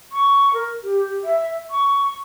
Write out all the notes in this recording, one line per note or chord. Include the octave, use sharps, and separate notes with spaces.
C#6
A#4
G4
E5
C#6